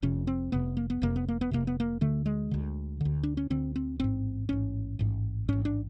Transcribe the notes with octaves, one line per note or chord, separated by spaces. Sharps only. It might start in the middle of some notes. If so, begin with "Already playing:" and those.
F1 F2 C3 C#4
C4
F1 F2 C3 B3
A#3
B3
F1 F2 C3 A#3
B3
A#3
B3
F1 F2 C3 A#3
B3
A#3
D2 D3 A3
G#3
D2 D3
D2 D3
D4
C#4
D2 D3 C4
C4
A1 G#2 C4
A1 G#2 C#4
A1 G#2
A1 G#2 C#4
D4